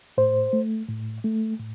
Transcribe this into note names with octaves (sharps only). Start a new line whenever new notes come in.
A2 C5
A3
A2
A3
A2